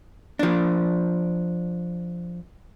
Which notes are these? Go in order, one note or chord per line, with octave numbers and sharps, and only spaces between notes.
F3 D4